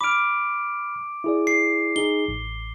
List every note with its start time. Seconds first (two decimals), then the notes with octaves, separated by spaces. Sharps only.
0.01 B5 D6 F6 D7
1.24 E4 G#4 D5
1.47 C7
1.96 D#4 G#4 G7
2.28 A1